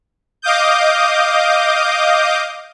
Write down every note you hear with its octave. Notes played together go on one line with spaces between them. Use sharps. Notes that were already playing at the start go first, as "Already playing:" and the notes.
D#5 F5 D6 D#6 G6